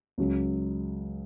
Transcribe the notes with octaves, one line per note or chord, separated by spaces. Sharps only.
C#2 C#3 F#3